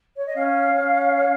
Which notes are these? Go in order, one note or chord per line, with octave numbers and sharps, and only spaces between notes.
C#5
D#5
C#4 F5
C#4
C#5